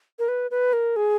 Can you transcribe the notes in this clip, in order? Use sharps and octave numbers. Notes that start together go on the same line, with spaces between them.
A#4
B4
B4
A#4
G#4